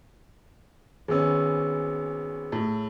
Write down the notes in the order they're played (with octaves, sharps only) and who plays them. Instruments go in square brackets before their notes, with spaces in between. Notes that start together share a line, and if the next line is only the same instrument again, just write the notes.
[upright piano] G#1 B3 C#4 [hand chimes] G#4 E6
[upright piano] A2